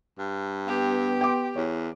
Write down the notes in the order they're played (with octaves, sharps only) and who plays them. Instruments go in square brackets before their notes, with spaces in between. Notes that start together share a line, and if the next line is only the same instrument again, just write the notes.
[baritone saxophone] G2
[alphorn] B3 [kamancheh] G4
[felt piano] G5 C6 D6
[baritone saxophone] E2 [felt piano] C#5